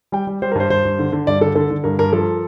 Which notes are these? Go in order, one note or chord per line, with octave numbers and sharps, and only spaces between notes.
G3 G5
G3
G3 C5
A#4
G2 C5
G2 C5
G2
D3
D3
G2 D5
D3 A4
D3 A4
D3
G2 A#4
G2 A#4
F3 A4